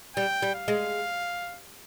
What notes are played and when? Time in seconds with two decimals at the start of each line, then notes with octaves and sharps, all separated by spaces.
0.16 G3 G5
0.42 G3
0.55 F5
0.68 G#3